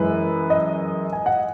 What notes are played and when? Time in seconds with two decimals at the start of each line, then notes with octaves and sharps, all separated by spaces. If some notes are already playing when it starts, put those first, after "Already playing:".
Already playing: F#2 E3 G#3 B4
0.50 D#5
1.13 G#5
1.26 F#5